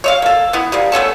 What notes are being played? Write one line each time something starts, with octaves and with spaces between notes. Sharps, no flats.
C#5 E5 F5
A#3 A4
B3 E4
C3 G3 A#3
A3 B3 C#4 A4